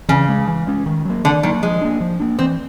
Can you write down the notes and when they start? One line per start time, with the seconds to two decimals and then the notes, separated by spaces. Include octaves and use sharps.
0.09 C#3 E3
0.29 G#3 C#4
0.48 E3
0.67 G#3 C#4
0.86 D#3
1.05 F#3 A#3
1.24 D3 D#3
1.43 D#3 F#3 A#3
1.63 F3 G#3
1.81 A#3 D4
2.01 F3
2.20 A#3 D4
2.39 E3 C4